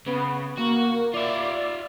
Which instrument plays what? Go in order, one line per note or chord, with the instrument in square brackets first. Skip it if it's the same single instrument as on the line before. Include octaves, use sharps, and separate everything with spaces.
[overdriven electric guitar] C#3 [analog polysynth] B3
[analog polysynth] A#3 [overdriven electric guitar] F#4
[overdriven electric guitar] F4 E5 [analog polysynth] D5